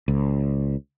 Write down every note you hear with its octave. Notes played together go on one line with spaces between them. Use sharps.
C#2